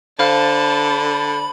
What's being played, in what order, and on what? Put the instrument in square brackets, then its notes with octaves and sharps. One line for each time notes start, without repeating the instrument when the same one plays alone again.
[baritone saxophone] D3 [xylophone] C5 F5 F6 [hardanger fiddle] A5 [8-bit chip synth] B5